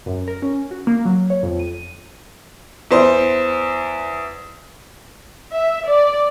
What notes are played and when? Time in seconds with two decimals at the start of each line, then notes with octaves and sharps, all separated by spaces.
0.06 F#2
0.28 A#4
0.42 C#4
0.71 F#4
0.87 A#3
1.05 F#3
1.30 C#5
1.43 F2
1.59 D#7
2.91 E2 C5
5.53 E5
5.86 D5